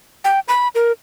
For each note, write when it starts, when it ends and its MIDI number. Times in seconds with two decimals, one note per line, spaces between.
0.24 0.40 79
0.48 0.68 83
0.75 0.92 70